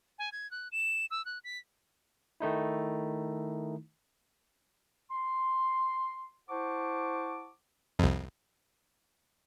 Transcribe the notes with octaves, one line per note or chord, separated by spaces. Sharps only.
G#5
G#6
F#6
E7
E6
F#6
B6
D#3 A3 D#4 E4
C6
E4 C5 F#5 A5 C#6 D6
C2 F2